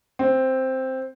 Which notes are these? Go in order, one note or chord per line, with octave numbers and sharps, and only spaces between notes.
C4